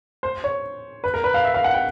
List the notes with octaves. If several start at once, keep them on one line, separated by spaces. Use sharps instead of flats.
C5
C#5
B4
A#4
B4
F5
E5
F5
F#5
G5